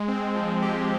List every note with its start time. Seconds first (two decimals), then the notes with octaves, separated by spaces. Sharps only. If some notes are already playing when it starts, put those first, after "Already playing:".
Already playing: G#3
0.08 C4
0.35 F3
0.62 G4